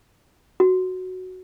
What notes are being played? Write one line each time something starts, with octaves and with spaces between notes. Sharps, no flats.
F#4